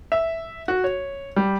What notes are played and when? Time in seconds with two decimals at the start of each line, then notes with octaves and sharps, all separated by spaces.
0.12 E5
0.68 F#4
0.84 C#5
1.36 G3